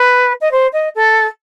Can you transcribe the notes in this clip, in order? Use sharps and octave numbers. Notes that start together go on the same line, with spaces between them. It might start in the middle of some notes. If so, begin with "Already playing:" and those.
Already playing: B4
D#5
C5
D#5
A4